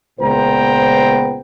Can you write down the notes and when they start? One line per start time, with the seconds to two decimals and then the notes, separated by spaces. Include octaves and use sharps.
0.20 C#2 A#2 B3 C5 G5 A#5